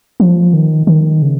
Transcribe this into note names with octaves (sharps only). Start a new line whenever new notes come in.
F3
D#3
D#3
C#3